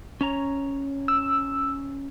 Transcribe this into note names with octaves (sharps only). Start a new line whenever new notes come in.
C#4 C#5 A#5
E6